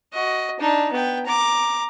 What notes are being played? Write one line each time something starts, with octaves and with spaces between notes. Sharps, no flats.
F#4 D#5
D4 D#4
B3 G5
A#5 D6